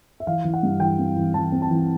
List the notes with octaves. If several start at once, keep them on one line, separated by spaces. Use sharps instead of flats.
E5
E3 F5
E3
F#5
G2
E3 G5
C4
E3
E3 A5
C4
A5
E3